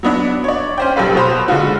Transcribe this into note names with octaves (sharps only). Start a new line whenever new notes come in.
F#3 B3 D4
C#5 D5
C#4 C5 G5
F#1 B1 G4 A4 B4 F5
B2 C5 B5
D3 G#3 F4 F#4